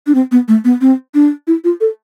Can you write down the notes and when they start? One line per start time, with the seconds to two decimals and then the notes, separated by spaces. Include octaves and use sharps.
0.07 D4
0.15 C4
0.32 B3
0.48 A3
0.65 B3
0.81 C4
1.14 D4
1.47 E4
1.64 F4
1.81 A4